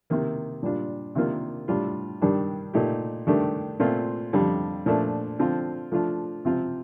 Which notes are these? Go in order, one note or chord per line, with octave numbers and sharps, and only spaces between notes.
C3 D#3 A#3
A#2 G3 D4 F4
C3 D#3 A#3 D4 F4
A2 G3 D4 F4
G2 D#3 G3 D4
A#2 A3 D#4 G4
G2 D#3 A3 D4 G4
A#2 A3 C4 F4
F2 D3 G3
A#2 F3 A3 D4
D3 F3 C4 F4
F3 A3 D4 F4
C3 F3 C4 F4